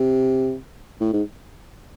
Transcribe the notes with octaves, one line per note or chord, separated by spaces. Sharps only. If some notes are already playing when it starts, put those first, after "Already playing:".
Already playing: C3
A2
G#2